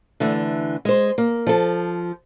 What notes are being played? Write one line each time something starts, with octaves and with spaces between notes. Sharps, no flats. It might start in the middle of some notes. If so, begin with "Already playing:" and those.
D3 E3 A3
G#3 C5
A#3
F3 A4